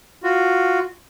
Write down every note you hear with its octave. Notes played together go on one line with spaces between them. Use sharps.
F4 F#4